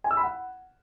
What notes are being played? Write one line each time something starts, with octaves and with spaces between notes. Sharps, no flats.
G#5
E6
B5
F#5